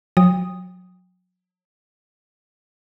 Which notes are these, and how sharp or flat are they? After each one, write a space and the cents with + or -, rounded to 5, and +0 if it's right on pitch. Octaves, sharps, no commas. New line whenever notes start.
F#3 -30 G5 +35 D#6 +0